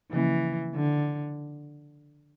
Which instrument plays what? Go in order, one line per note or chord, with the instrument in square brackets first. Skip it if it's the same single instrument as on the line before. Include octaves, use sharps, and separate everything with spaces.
[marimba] C#3 F3 A#3 C#4 [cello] E3
[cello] D3